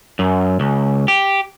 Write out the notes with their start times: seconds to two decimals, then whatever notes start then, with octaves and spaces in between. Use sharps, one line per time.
0.19 F#2
0.60 C#2
1.08 G4